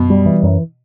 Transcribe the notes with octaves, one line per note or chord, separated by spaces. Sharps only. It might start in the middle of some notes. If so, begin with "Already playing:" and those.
Already playing: F#2 B2
G3
E3
F#2